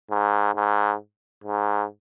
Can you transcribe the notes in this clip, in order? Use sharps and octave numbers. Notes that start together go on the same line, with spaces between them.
G#2
G#2
G#2